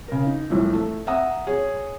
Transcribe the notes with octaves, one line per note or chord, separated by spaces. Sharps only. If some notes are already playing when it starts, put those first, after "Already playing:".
C#3 A#4
D#4
C2 A2 E3 F3
A3
E5 F#5 A#5 D#6
G#4 C#5